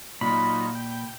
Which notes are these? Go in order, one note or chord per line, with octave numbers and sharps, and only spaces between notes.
A#2 F#3 D#4 F4 B5
G5